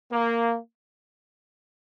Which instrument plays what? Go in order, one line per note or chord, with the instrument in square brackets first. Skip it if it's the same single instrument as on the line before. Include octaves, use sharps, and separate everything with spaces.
[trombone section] A#3